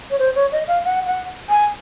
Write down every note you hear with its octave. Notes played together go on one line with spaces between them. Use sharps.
C#5
C5
C#5
D#5
F5
F#5
F#5
G#5